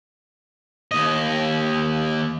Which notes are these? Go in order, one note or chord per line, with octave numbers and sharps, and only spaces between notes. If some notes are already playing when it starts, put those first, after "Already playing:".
D#2 D#5